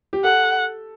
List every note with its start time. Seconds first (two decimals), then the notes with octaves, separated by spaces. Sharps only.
0.13 G4
0.24 A4 F#5